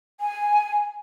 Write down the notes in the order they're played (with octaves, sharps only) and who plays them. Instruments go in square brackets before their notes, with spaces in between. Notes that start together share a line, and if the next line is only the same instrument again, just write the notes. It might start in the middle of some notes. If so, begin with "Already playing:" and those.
[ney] G#5